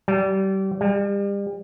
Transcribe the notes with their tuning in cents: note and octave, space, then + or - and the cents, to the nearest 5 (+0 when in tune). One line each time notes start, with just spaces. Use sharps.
G3 -30
G3 +35